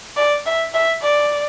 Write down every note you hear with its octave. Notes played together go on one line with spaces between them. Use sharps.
D5
E5
E5
D5